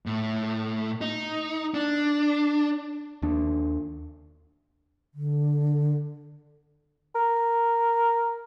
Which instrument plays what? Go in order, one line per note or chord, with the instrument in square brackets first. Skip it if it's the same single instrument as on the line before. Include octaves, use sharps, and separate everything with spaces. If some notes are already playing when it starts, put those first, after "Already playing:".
[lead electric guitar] A2
D#4
D4
[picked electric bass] D#2 D4
[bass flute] D3
[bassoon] A#4